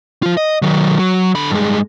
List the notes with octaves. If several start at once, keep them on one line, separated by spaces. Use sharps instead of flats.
F3 F4
D#5
D#3 F#3
F#3
D3 B5
G2 G#3